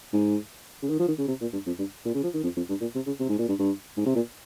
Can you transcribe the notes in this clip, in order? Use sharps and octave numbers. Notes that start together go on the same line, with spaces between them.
G#2
C#3
D#3
F3
D#3
C#3
C3
A#2
G2
F2
G2
A#2
C#3
F3
D#3
F2
F2
G2
A#2
C3
C#3
C3
G#2
A#2
G2
G2
G#2
C3
A#2